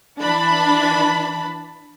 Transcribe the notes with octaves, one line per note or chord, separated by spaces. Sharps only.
E3 D4 A5 B5